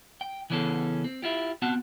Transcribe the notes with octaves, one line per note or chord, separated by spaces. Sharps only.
G5
C#3 E3 B3 C#4 G#4 A4
C4
E4 F4 G4
B3 C4 F#4 F#5 A5